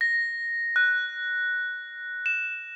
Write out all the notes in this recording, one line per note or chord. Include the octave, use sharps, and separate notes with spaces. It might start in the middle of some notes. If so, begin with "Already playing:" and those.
A#6
F#6
E7